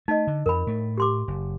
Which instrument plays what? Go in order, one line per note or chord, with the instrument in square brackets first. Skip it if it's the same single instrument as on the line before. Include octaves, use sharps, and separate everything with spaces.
[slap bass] A3 [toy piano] D#4 D#5
[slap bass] D3
[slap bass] F2 F3 [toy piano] A#4 B5
[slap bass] A2 A3
[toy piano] G4 C6 D6
[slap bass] F#1